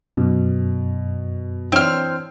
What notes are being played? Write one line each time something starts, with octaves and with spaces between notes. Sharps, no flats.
F#2 B2
E3 C4 D4 C#5 F6